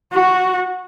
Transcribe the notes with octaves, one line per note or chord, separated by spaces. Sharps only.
F#4